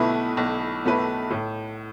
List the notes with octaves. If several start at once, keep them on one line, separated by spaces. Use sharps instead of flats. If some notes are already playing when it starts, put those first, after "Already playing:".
Already playing: B1 B2 A3 E4 B4
B1
B2 A3 E4 B4
A2